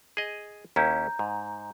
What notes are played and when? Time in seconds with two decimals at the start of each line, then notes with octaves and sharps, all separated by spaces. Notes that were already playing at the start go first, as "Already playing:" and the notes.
0.17 G#4 D#5
0.76 D#2 C#4 E4 A#5 G6
1.19 G#2